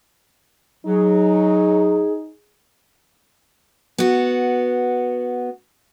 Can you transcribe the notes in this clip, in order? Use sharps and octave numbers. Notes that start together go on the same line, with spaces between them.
F#3 D#4 G#4
B3 F#4